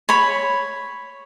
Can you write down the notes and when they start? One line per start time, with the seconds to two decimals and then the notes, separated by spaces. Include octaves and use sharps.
0.09 C#5 B5